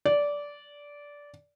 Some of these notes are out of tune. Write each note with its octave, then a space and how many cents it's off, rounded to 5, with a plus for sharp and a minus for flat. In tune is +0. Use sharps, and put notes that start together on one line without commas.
D5 -15